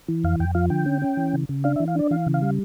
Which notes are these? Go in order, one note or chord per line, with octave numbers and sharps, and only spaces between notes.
E3
F2 F5
F2 G5
F3 F5
D3 G5
C#4
C#4
E3
C#3
C#3
D4 F5
E5
E3
F5
D4 D5
E3 F5
C#3
F5
G3